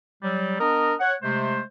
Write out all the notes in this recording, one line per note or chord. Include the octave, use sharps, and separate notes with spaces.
F#3 G3
B3 D4 A#4 D#5 A#5
C#5 F#5
C3 G#3 A3 C5